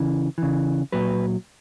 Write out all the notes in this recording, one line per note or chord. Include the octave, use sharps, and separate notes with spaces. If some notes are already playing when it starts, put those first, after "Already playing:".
Already playing: C#3 E3
C#3 E3
A#2 F#3 B4